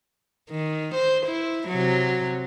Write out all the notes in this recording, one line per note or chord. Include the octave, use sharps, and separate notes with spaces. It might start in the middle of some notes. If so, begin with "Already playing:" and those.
D#3
C5
E4
C3 F#3